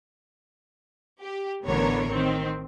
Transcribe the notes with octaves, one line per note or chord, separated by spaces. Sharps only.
G4
A1 D3 E3 B3 A#4 C#5
D#3 C4